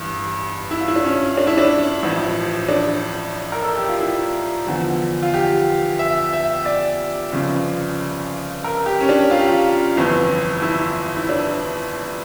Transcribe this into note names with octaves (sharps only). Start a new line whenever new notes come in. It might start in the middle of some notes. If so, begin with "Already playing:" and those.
Already playing: A1 G2 E3
E4
F4
E4
D4
C#4
D4
E4
D4
A1 A2 F3
D4
A#4
A4
G4
F4
E4
E2 D3 F3
F4
G4
E5
E5
D5
G1 F2 C#3 F3
A#4
G4
C#4
D4
F4
G4
F4
G1 F2 E3
E4
E4
D4